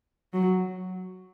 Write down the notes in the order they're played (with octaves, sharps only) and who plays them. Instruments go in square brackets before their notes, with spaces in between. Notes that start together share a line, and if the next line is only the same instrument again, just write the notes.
[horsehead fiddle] F#3